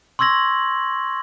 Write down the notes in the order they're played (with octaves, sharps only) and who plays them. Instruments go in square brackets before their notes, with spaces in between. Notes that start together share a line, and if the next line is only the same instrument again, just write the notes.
[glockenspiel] C6 C#6 E6 G#6 A#6 F#7